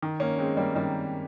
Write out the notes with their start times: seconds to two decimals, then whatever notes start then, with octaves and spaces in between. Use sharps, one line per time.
0.03 D#3
0.20 A#3 C#4
0.39 G#3 C4
0.57 G3 A#3
0.76 D#3 G3